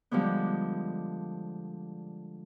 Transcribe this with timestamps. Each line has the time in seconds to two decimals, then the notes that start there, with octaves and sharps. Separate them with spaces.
0.11 D3 F3 G3 G#3 B3